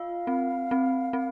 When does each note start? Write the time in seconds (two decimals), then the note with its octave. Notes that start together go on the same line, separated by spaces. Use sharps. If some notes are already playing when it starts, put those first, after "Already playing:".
Already playing: F4 F5
0.27 C4
0.71 C4
1.13 C4